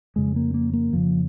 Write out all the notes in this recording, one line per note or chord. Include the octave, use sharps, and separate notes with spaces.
F2 C#3 G#3
A#3
A#3
A#3
F2 C#3 F3